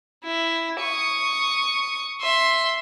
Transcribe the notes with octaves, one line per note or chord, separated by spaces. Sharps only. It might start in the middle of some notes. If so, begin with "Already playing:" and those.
E4
C#6 D#6
E5 C6